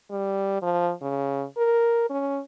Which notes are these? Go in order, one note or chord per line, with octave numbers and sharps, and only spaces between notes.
G3
F3
C#3
A#4
C#4